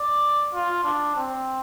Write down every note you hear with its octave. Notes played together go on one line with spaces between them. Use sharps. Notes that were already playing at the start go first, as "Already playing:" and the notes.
Already playing: D5
F4
D4
C4